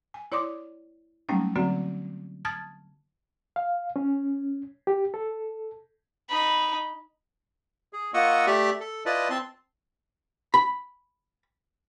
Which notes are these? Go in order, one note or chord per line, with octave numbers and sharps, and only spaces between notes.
G#5
E4 C#5 D5 C6 D6 D#6
F#3 G3 A3 A#3 C#4 D#4
D3 F#3 A#3 C4 F#4
A5 D#6 F6 G#6 A6
F5
C#4
G4
A4
D#4 B5
G#4
A#3 F4 D#5 F#5 C#6 E6
A3 G4 D5 E5
A4
E4 F4 B4 D5 D#5 A5
C4 A5 C6
B5